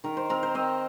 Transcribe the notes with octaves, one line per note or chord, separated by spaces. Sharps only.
D#3 A#4
C5
C4 A#4
C5
C4 D#5